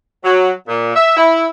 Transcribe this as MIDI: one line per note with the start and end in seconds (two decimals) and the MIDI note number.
0.24 0.51 54
0.68 0.92 46
0.96 1.14 76
1.17 1.46 64